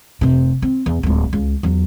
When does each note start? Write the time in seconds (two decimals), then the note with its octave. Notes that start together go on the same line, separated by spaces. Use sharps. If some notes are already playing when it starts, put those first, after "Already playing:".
0.21 F1 C3
0.62 C4
0.86 E2
1.03 D1 G#3
1.33 C#2
1.63 E2 F#3